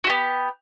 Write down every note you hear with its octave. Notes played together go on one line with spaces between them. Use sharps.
B3 F#4 G4